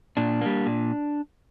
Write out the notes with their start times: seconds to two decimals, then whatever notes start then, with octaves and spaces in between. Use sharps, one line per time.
0.17 A#2 D4
0.41 G3 A#3
0.66 A#2